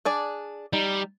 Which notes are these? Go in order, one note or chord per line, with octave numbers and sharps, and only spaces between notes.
D4 G#4 D5
G3 D#4